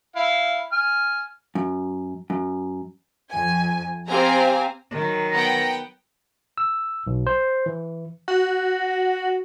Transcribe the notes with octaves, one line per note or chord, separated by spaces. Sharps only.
E4 F5
G#5 F6
F#2
F#2
F2 G#5
C4 G4 C5 F5 G#5 A#5
D#3 F#3
B3 F#5 G5 A#5
E6
B1
C5
E3
F#4